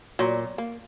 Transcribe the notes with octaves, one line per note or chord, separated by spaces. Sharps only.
A#2 F#3
A#3